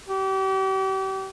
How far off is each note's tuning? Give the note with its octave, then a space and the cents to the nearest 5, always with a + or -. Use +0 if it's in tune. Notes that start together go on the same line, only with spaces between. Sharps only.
G4 -35